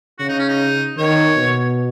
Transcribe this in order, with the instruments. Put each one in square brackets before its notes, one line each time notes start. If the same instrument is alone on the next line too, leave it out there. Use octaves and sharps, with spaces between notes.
[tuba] C#3 [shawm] F#4
[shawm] D#4
C#4
D#4
[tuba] D#3 [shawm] C#5
[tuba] B2